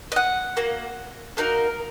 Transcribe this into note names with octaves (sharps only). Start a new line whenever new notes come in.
D#5
F#5
A#3 F#4
A#3 D#4 F#4 A#4